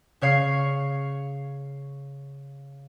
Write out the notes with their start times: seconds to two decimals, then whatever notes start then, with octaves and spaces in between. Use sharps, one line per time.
0.21 C#3 C#5 F5 C#6 C7